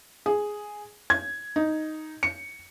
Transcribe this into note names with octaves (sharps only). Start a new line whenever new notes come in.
G#4
G#6
D#4
C#7